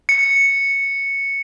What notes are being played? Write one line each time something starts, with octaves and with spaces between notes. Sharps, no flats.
C#7